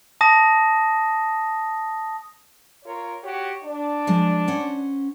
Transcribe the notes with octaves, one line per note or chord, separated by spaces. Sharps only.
A5 D#6 A#6
F4 A#4 C#5
F#4 G4 C#5
D4
F3 G#3
C#4 C5 F#5